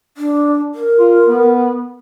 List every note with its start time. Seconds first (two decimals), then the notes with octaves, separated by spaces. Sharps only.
0.17 D4
0.75 A#4
0.99 F4
1.27 B3